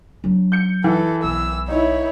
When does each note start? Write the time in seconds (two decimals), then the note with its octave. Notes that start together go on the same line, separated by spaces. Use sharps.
0.24 F#3 D4
0.52 G6 C#7
0.84 E3 A4
1.24 B1 E6
1.68 D#4 E4 C#5